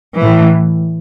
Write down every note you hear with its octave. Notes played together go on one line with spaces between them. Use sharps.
A2 E3